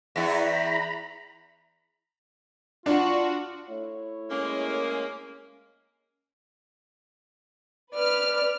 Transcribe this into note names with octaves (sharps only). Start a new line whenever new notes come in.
E2 E4 A#5 B5
D4 F4 F#4
A3 E4 C#5
G#3 A#3 C#4
B4 D5 F6